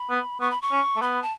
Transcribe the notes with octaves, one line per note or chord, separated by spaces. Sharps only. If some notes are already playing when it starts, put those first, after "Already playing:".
Already playing: B5
B3
B3 C#6
B5
C#6
C#4
A3
B3 B5
A5